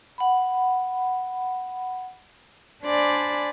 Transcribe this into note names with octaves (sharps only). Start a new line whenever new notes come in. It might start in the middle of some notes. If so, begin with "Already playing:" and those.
F#5 B5
D4 C5 D5 G#5 B5